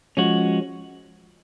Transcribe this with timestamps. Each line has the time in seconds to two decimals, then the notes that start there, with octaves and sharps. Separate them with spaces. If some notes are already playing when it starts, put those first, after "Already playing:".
0.17 F3 G#3 C#4 F#4